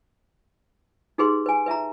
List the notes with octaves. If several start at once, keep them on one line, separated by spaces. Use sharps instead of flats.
D#4 G4 G#4 B4 C6
B4 G#5
B4 E5 A5 A#5